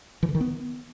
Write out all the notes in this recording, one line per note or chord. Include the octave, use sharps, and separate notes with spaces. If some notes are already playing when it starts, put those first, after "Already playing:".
E3
D3
D#3
B3